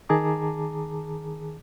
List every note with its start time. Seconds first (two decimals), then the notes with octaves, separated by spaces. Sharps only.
0.09 D#3 G#4 A5 A#5 D6